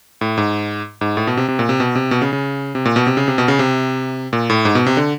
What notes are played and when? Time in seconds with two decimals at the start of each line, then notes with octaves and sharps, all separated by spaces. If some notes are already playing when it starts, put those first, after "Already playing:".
0.21 A2
0.38 G#2
1.01 G#2
1.17 A2
1.27 B2
1.37 C3
1.48 C3
1.59 A#2
1.69 C3
1.80 B2
1.96 C3
2.11 B2
2.22 C#3
2.33 C#3
2.75 C3
2.85 A#2
2.96 B2
3.07 C3
3.17 C#3
3.28 C3
3.38 B2
3.48 C#3
3.59 C3
4.33 A#2
4.50 A2
4.65 G#2
4.75 B2
4.86 C3
4.97 D3